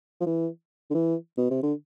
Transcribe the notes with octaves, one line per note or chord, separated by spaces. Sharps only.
F3
E3
D3
E3
B2
C3
D3